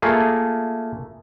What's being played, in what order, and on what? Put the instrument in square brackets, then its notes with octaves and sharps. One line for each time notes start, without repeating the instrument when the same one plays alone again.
[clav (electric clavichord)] A3 A#3 F4 G#4